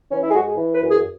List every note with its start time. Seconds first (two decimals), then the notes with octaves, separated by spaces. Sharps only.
0.11 E3 C#4
0.23 E4
0.30 G#4
0.35 G#2 F#4
0.47 G#4
0.57 E3
0.74 B4
0.81 F#2
0.89 G#4